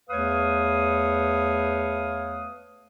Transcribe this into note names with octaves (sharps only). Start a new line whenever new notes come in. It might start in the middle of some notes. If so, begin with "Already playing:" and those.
E2 A3 B4 C#5 F5 D#6